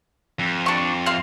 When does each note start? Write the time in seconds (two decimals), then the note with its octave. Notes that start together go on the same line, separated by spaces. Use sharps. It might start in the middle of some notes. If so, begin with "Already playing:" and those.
0.39 F2
0.66 D4 C#6
1.06 C4 F5